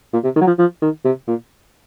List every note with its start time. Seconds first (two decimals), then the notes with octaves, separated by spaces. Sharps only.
0.13 A#2
0.24 C3
0.36 D#3
0.41 F#3
0.47 F3
0.59 F3
0.82 D#3
1.05 C3
1.28 A#2